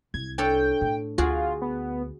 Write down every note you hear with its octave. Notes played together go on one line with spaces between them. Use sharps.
C2 G#6
D4 A4 C#5 G5
A2
D2 F4 F#4 G#4 D5
B3